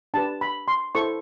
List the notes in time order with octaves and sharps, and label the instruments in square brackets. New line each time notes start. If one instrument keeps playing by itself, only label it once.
[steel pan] D4 G4 B4 A5
B5
C6
E4 A4 C5 C#6